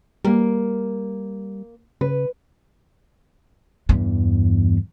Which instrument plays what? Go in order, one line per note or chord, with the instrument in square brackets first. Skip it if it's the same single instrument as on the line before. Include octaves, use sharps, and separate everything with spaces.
[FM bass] G3 [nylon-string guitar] A#3 A#4
[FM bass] C#3 [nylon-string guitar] B4
[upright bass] E2 G2